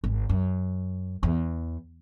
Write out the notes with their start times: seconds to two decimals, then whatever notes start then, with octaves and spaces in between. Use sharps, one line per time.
0.04 G#1
0.29 F#2
1.23 E2